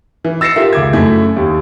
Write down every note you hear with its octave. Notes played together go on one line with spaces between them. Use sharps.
E3
E6 A6 A#6 C7 C#7 E7
F4 G4 A#4 E5
C#2 D6 G#6
F#2 A3 E4 G#6
D#2